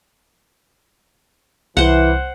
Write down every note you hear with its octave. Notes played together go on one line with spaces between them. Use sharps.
C2 E3 C5 F#5